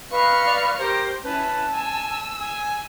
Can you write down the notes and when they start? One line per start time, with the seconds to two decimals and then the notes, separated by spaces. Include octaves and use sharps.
0.12 B4 D#5 F5 C#6 F6
0.46 D5
0.78 G4 A#4 C5 G5
1.24 C#4 E4 B4 A5
1.72 G#5 E6
2.41 G#5